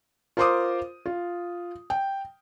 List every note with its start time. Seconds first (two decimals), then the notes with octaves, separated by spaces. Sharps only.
0.37 F4 A#4 C5 C6 D6 D#6
1.06 F4
1.90 G5